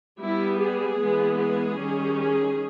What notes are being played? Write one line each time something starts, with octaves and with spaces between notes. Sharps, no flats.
G3 B3 E4
G#4
E3 G#3 B3
G#4
D#3 G3 C#4
G#4